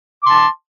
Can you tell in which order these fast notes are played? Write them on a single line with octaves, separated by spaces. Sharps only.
D6 C6 A5